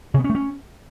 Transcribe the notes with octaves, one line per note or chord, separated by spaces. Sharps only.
C3
B3
C#4
A3
C#4